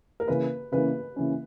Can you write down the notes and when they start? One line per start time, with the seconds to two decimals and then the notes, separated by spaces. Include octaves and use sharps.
0.20 A#4
0.28 C#3 E3 A#3 C#4 B4
0.72 C#3 E3 A#3 C#4 B4
1.16 C#3 E3 A#3 C#4